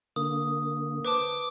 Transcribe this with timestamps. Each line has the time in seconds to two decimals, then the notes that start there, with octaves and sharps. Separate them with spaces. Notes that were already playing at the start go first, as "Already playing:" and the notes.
0.16 D3 A#3 D#6
1.05 B4 C5 A5 D6